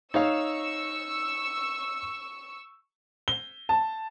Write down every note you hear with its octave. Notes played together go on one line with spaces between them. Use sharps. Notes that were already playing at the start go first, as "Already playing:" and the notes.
D#4 C#5 F5 C#6 E6
G7
A5